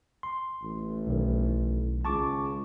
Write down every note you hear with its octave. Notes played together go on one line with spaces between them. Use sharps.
C6
A1
B1 D#3
C#2 A5 C#6 D6